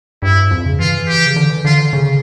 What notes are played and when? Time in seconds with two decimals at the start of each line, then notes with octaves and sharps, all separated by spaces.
0.22 G2 E4
0.51 F2
0.66 C#3
0.79 E3 F4
1.08 G4
1.26 C#3
1.36 D3
1.50 E3
1.65 D3 F4
1.93 C#3